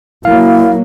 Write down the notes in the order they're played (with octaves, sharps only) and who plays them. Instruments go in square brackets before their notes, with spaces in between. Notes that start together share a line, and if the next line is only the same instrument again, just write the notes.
[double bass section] F#3 A#3 [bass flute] E4 [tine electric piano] F5